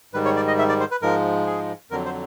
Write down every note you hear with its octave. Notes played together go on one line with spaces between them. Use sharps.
G#2 D#3 G3 B4
C#5
D5
D#5
E5
D5
C5
B4
G#2 F3 G#3 A#4
G#4
F2 D3 F#3 A#4
C5